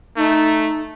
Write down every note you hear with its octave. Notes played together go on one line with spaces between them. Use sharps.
A3 D#4